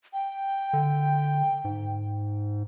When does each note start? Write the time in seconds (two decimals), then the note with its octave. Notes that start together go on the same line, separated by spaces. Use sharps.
0.13 G5
0.73 D3
1.64 G#2